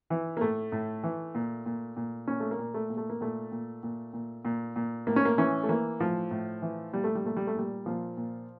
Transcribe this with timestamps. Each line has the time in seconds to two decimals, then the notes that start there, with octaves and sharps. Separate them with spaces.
0.10 E3
0.37 A#3
0.41 A2 A3
0.72 A2
1.03 E3
1.35 A#2
1.66 A#2
1.97 A#2
2.27 A#2 C#4
2.40 A3
2.51 A#3
2.59 A#2
2.74 A3
2.90 A#2
2.97 A3
3.10 A#3
3.21 A#2 A3
3.52 A#2
3.83 A#2
4.13 A#2
4.45 A#2
4.76 A#2
5.07 A2 A#3
5.16 C#4
5.25 A#3
5.38 E3 C#4
5.63 A3
5.69 E3 A#3
6.00 A2 F3
6.31 A2
6.62 E3
6.93 A#2 G3
7.04 A3
7.15 G3
7.24 A#2 A3
7.37 G3
7.47 A3
7.55 A#2 G3
7.86 A#2 F3
8.17 A#2